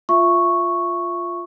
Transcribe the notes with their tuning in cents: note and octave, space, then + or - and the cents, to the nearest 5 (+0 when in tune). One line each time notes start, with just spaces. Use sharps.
F4 +0 E5 +20 C#6 -5